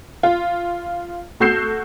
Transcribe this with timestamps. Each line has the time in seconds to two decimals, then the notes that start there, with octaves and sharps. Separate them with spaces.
0.23 F4
1.40 A3 F#4 E6 G6 C7 E7